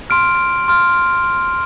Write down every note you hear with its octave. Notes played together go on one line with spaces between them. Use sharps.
C6 F6 D7
C6 F6